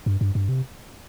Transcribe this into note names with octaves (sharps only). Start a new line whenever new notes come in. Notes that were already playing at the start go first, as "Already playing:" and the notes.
G2
G2
G2
C3